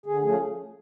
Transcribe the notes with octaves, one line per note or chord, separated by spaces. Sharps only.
D3 G#4
F3 A3 C#4 G#4